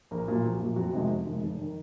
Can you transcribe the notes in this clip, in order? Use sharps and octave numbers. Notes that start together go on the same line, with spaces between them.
A#1 A#4
A#2 F#3
A#1
A#2 F#3
F2 F#4
C3 D#3 G#3
F2
C3 D#3 G#3
F1
D#3